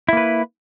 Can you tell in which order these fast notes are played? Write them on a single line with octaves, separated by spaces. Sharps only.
E4 A#3 B4